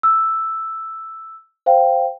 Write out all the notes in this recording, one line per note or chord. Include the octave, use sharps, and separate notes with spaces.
E6
C5 F5 G5